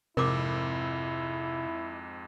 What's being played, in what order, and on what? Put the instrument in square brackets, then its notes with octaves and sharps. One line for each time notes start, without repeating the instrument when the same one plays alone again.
[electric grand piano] F2 G#2 [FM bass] C3 [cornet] E4 [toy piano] A#4 D6